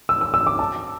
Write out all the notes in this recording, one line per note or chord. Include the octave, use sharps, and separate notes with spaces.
E6
E6
E6
D6
A5